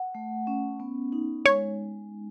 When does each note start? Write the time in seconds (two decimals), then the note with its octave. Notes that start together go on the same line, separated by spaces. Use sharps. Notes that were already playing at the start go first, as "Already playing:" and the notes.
Already playing: F#5
0.15 A3
0.47 C#4
0.80 B3
1.12 D#4
1.45 G#3 C#5